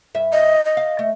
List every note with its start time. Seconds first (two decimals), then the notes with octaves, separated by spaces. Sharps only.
0.14 G2 E5
0.32 D#5
0.65 D#5
0.77 F5
0.99 A3